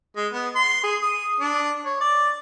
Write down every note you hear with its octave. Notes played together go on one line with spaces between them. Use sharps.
G#3
B3
C6
G#4
D#6
D4
C#5
D5